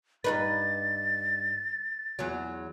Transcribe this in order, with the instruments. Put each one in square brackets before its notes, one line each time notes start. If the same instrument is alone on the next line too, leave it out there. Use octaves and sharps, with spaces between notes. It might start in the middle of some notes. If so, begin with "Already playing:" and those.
[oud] G2 D#4 B4 [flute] A6
[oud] E2 F#3